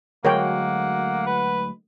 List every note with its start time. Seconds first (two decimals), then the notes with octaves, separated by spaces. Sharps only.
0.25 D2 F#3 G#3 A#3 A#4 C#5 F#5 G5
1.26 B4